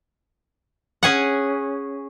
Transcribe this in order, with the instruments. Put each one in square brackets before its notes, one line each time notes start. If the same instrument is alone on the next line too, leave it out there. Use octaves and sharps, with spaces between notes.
[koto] C#4 G#4 F#5